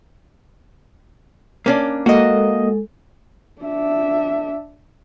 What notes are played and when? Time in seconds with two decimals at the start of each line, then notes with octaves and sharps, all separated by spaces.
1.66 A#3 C#4 D4
2.06 G#3 A#3 F#4 A4 D#5
3.62 D4 E5